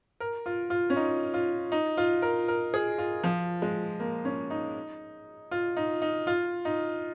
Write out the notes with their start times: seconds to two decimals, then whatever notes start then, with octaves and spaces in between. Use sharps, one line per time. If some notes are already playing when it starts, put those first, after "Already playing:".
0.20 A#4
0.46 F4
0.70 F4
0.90 C#4
0.96 D#4
1.34 F4
1.72 D#4
1.97 F4
2.22 A#4
2.48 A#4
2.74 G#4
2.98 F4
3.24 F3
3.62 G#3
4.00 A#3
4.25 C#4
4.50 D#4
5.51 F4
5.77 D#4
6.02 D#4
6.27 F4
6.65 D#4